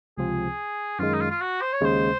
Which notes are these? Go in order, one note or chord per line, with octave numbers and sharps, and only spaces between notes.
C#2 C3 F3 C4 F4 G#4
F#2 D#3 G#3 F4
D#4
F4
F4
F#4
C5
C#5
D#2 C#3 G#3 C5